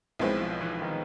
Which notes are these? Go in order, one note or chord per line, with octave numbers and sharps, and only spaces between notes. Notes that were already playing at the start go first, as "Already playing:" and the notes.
B1 B2 F3 G#3 C4 E4
F3
E3
D#3